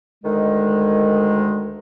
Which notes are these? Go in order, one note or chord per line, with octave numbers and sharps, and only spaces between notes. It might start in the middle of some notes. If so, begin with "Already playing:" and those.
D2 D#3 G#3